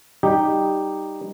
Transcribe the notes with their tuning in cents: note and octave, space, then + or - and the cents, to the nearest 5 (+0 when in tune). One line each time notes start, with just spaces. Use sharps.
G3 +0 D#4 -5 G4 +0